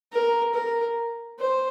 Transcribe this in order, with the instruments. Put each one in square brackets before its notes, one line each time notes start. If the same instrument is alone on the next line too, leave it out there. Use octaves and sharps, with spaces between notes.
[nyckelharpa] A#4
A#4
C5